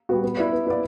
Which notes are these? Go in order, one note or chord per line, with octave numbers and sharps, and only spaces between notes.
G3 B3 F#4
B3
E4 B4 D5
B3
E4 B4 D5